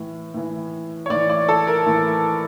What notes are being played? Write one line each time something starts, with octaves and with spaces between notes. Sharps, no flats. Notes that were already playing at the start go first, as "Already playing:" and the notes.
Already playing: A2 E3
A2 E3
C#5
A2 E3 D5
D5
A4
A#4
A2 E3